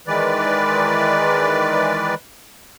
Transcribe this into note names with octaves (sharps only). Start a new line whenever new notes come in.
D#3 E3 G#3 B4 D5